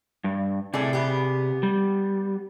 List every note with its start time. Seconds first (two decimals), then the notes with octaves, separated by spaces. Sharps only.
0.24 G2
0.74 A2 C3 A3 G#4 D5
0.93 B3 G4
1.63 G3